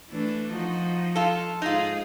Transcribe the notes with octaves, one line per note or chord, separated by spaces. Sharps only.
E3 A3 D4
F3 D#4 F#4
F4 A4
G#2 D#4 F4 G#4